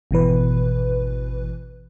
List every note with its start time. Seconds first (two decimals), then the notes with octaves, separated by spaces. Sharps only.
0.11 G#1 B2 E3 B4